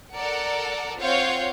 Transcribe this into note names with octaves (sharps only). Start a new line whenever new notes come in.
A4 A#4 D5 F#5
C4 F4 C#5 F5 F#5 G6